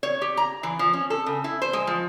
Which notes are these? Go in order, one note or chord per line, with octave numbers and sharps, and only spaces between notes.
C#5
G4
A#5
E3
F3
C#4
A4
C#3
E4
C5
G#3
F3